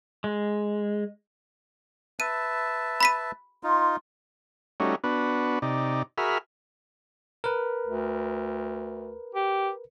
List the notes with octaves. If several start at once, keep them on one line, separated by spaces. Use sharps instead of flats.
G#3
B4 E5 A5 D#7
B5 B6 D#7
D#4 F4 C6
G3 A3 C#4 D#4 F#4
B3 D4 F#4 B4
C3 D#4 D5
F#4 G#4 A#4 E5 B5 F6
A#4 B4
D2
G4